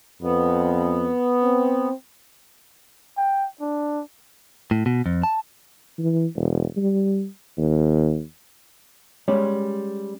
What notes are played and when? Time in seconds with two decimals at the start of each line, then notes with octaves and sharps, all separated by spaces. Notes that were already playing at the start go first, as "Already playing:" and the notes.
0.22 F2 B3
1.43 C4
3.17 G5
3.61 D4
4.71 A2
4.86 B2
5.06 F2
5.23 A5
5.98 E3
6.36 E1
6.77 G3
7.57 D#2
9.28 G3 G#3 C#4 C#5 D5